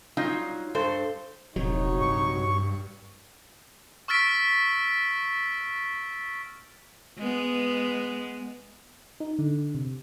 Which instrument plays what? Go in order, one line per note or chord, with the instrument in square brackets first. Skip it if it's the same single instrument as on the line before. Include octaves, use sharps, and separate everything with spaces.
[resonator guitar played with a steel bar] F#3 G3 D#4 F4
G2 A4 C5
[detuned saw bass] E1 [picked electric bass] A#1 C3 F#3 [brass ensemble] D#4 F#4 C#5
[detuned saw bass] G2 [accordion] C#6
[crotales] C#6 E6 F6 A6 B6 D7
[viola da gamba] G#3 B3
[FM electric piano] D#4
D3
C3